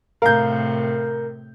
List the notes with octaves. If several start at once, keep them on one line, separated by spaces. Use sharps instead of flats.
A2 C3 A#4 F5 G6